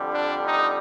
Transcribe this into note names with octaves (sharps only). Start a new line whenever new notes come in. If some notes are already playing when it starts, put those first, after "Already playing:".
Already playing: F2 D3 G3
D4
D#4